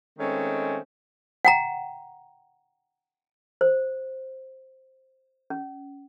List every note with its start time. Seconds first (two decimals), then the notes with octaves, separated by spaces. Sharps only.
0.19 D#3 G#3 A3 C4 C#4
1.45 F#5 G5 A#5
3.61 C5
5.50 C#4